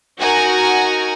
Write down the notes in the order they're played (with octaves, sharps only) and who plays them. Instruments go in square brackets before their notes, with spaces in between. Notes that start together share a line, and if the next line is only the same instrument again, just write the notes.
[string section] D#4 F#4 A#4 F#5 G#5 A#5